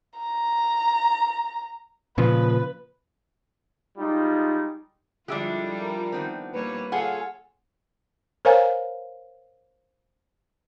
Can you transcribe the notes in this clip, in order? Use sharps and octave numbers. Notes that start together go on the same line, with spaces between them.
A#5
A#2 C#3 F3 B4
G3 G#3 D#4 F4
D3 F3 G3 G#3 D4 E4 F4 G4
A#4
D#3 B3 C4
G3 A#3 B4 C#5
F4 G#4 A4 C#5 F#5 G#5
A#4 C5 C#5 F5 G#5 A#5